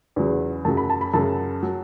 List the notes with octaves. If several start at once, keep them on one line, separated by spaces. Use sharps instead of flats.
E2 C#3 F#3
F#2 C#3 F#3 A5
B5
A5
B5
F#2 C#3 F#3 A5
F#3